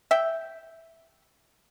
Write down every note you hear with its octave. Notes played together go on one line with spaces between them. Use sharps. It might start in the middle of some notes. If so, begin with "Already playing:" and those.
E5 G5